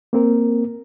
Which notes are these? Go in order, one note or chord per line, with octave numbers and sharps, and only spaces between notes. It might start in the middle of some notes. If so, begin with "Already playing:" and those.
A#3 C4 A#4